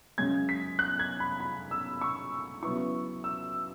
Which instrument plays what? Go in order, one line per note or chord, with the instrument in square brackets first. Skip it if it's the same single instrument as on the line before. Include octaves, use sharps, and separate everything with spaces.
[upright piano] F#2 C#3 G#3 C#4 G#6
B6
F#6
G#6
B5
B5
E6
C#6
C#3 F#3 B3 E4 C#6
E6